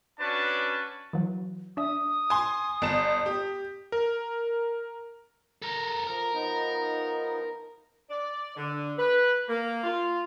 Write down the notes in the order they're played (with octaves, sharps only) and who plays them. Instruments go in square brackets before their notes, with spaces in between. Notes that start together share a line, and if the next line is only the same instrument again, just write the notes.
[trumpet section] C#4 D4 F#4 B4 A5
[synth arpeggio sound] E3 F#3
[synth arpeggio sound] D4 E5 [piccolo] D#6
[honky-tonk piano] G#5 C6
G1 A5 E7
G4
[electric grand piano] A#4
[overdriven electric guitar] A4 A#4
[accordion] F3 [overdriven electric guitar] A#4
[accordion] F3 B3 D#4
[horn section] D5
D3
B4
A#3
F4